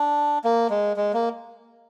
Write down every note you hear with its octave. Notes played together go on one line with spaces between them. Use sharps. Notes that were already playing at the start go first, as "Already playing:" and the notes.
Already playing: D4
A#3
G#3
G#3
A#3